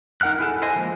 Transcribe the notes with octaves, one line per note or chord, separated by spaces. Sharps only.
D#4 A#4 F#5 F6 F#6
E4 G#4 A4
E4 C5 D#5 G#5
F3 G#3 A#3